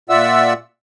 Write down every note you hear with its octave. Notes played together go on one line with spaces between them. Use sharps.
A#2 F4 D5 E5 F#5 E6